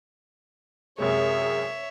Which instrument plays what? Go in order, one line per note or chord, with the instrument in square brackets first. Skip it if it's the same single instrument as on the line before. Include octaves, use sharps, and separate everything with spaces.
[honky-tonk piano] F#2 C3 G#3 [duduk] G#4 [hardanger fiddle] C#5 E5